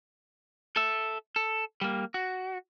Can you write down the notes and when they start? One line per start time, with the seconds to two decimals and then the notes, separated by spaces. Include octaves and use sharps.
0.76 A4 E5
1.36 A4
1.81 G3 A#3
2.14 F#4